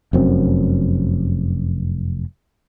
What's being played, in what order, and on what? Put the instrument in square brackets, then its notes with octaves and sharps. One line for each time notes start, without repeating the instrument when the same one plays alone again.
[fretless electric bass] F1 F#2 C4